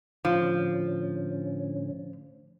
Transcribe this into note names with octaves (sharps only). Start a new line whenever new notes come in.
A2 D3 F3 C#4